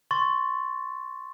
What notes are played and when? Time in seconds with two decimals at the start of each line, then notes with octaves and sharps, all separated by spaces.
0.11 C6 C#6 A6